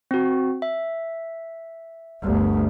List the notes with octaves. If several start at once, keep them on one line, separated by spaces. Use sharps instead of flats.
C4 F#4
E5
G1 D2